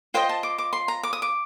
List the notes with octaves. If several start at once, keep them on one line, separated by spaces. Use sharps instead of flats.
F4 C5 D#5 G5
A5
D6
D6
C6
A#5
D6
D#6
D6